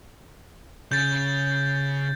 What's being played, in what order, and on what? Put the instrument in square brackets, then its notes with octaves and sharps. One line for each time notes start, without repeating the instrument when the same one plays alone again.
[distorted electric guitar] C#3 [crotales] G6 A6